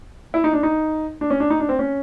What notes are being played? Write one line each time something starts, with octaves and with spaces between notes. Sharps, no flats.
E4
D#4
D4
D#4
D4
C#4
D4
D#4
D4
C4
C#4